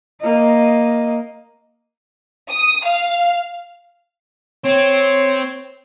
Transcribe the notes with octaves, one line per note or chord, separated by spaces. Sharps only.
A#3 D#5
D#6
F5
C4 C#5